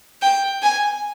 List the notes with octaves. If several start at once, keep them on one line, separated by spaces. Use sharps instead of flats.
G5
G#5